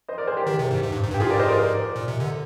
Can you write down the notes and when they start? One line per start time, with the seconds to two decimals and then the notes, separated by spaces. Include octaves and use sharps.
0.09 C5 D#5
0.18 A#4 D5
0.27 G#4 C5
0.37 G4 A#4
0.47 D#3
0.59 C3
0.71 G#2
0.84 G#2
0.92 G2
1.03 G#2
1.11 G2
1.14 G4
1.20 G#2 F4 G#4
1.30 A#4 D5
1.39 C5 D#5
1.48 A#4 D5
1.96 A#2
2.08 C3
2.20 D3